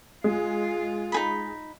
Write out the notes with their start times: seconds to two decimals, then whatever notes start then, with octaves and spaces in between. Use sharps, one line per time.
0.24 G#3 F4
1.12 D#4 G#4 B5